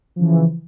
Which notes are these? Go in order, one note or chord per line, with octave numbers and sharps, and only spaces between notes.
C#3 E3 F3